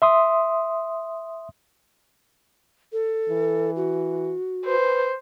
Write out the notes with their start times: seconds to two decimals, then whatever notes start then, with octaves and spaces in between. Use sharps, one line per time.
0.02 E5 C6 D#6
2.93 A4
3.29 E3
3.76 F#4
4.66 B4 C5